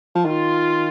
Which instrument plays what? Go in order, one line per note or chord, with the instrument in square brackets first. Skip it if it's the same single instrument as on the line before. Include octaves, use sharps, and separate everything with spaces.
[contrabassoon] F3
[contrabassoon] D#3 [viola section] F4